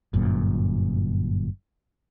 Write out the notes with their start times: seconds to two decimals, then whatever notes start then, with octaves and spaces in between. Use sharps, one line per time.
0.13 G1 F#2 A#2